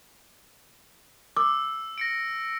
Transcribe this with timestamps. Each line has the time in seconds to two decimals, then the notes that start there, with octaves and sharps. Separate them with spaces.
1.37 D6 E6
1.98 A#6 C#7 D7